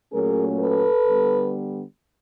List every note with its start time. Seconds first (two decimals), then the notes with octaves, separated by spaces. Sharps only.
0.13 A#2 F#3 A3 C#4 G#4 A#4
0.60 A4 B4
1.07 D3 G3 B3